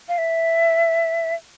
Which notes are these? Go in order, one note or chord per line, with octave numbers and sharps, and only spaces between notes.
F5
E5